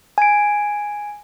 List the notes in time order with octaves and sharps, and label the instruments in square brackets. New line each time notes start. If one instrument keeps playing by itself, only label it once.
[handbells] G#5 D7